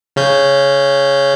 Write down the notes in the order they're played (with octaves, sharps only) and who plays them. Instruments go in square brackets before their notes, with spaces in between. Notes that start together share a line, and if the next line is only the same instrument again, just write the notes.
[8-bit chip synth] C#3 C#4 G6